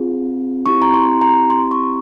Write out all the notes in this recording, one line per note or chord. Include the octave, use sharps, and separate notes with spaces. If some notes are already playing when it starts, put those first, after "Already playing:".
Already playing: C4 F4 G#4
C4 E4 G4 C#6
A#5
C6
A#5
C6
C#6